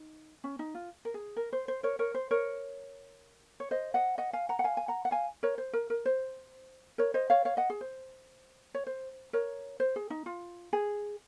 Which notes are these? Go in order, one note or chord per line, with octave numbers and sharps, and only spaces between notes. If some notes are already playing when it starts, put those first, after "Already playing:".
Already playing: D#4
C#4
D#4
F4
A#4
G#4
A#4
C5
C5
A#4 C#5
A#4 C#5
C5
A#4 C#5
C#5
C5 D#5
D#5 F#5
D#5 F#5
F5 G#5
F#5 A#5
F#5
F5 G#5
G#5
F#5 A#5
F#5
F5 G#5
A#4 C#5
C5
A#4
A#4
C5
A#4 C#5
C5 D#5
C#5 F5
C#5 F5
D#5 F#5
G#4
C5
C#5
C5
A#4 C#5
C5
G#4
D#4
F4
G#4